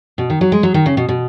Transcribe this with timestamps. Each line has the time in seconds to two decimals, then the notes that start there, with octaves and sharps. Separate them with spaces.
0.18 B2
0.30 D#3
0.41 F#3
0.52 G#3
0.63 F#3
0.74 D#3
0.86 C#3
0.97 B2
1.09 B2